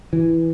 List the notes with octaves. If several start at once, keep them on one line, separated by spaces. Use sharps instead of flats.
E3